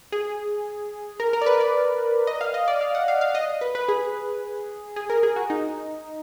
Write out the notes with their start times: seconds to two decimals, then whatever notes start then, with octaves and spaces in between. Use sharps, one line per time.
0.12 G#4
1.20 A#4
1.33 A#4
1.41 D5
1.46 B4
1.60 D5
2.27 D#5
2.41 F5
2.54 D#5
2.68 D5
2.81 F5
2.95 F#5
3.08 F5
3.21 F5
3.35 D#5
3.61 B4
3.75 B4
3.88 G#4
4.96 G#4
5.10 A#4
5.23 G#4
5.36 F#4
5.50 D#4